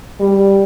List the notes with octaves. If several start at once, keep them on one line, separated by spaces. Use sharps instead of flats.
G3